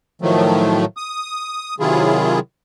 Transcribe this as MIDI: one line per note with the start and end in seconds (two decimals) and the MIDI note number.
0.22 0.85 45
0.22 0.85 51
0.22 0.85 53
0.22 0.85 54
0.22 0.85 57
0.97 1.75 87
1.80 2.39 48
1.80 2.39 51
1.80 2.39 54
1.80 2.39 64
1.80 2.39 65
1.80 2.39 68